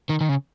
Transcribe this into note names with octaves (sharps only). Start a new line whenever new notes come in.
D#3
D#3
C#3